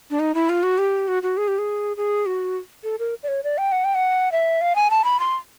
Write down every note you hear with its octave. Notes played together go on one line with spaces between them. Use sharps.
D4
D#4
E4
F4
F#4
G4
F#4
F#4
G#4
G4
G#4
G#4
F#4
A4
A#4
D5
C#5
D5
G5
F#5
G5
F#5
E5
F5
G#5
A5
B5
C6